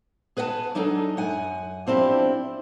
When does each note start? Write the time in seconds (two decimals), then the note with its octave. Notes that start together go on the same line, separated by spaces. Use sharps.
0.37 G#4 B4 D#5 F5 F#5 A5
0.75 F#3 D4 D#4 G#4 A4
1.17 F#2 F#5 G#5
1.87 F3 C4 D4 E4 G4